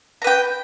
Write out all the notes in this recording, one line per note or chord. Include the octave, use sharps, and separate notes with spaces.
B4 G5 A#5